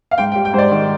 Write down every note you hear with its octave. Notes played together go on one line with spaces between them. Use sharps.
F5
G#2 G5
G5
G3
G5
G#2 C5
D5
D#3